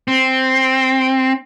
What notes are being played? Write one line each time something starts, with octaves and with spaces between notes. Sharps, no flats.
C4